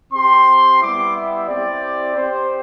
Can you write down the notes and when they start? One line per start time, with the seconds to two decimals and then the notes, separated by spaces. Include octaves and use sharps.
0.13 C4 G4 C6
0.80 G3 B3 E4 G4 D6
1.14 E5
1.47 C4 E4 G4 D5
2.14 C4 G4 C5